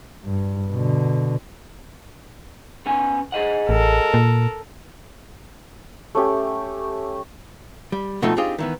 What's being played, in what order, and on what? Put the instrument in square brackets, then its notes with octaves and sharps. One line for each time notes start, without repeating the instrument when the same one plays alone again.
[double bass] G2
B2 D3
[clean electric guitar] B3 C#4 G#5
G#4 D#5 F#5
[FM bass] A1 [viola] A4 A#4
[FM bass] A#2
[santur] A3 C#4 G4
[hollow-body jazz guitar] G3
B2 F3 A3 C4 D#4
C4 D4 D#4 F4 G4 G#4
D#3 E3 B3